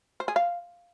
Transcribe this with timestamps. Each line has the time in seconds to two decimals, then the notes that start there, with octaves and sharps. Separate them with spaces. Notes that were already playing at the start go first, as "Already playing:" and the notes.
0.20 C5
0.28 G#4
0.36 F5